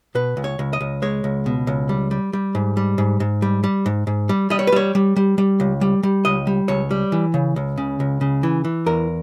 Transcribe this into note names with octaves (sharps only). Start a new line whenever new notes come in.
B2 B4
C#2
C#5
C#2
D#5
C#2
G#3 C#5
C#2
B2
C#2
G3
G3
G3
G#2
G3
G#2
G#2
G3
G3
G#2
G#2
G3
G3 D#5
C#5
B4
G3 C#5
G3
G3
G3
C#2
G3
G3
C#2 D#5
G3
C#2 C#5
G3
E3
C#3
C#2
C#3
C#2
C#3
E3
E3
E2 A#4